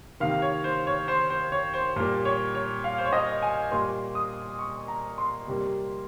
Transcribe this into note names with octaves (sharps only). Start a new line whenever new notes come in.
C3 D#3 A#3 F5
C#5
C5
C#5
C5
C5
C#5
C5
A#2 G3 A#3
C#5
C#5
F5
C5
C#5
D#5
G#5
A#2 G3 A#3 C6
D#6
C#6
A#5
C6
C3 G3 A#3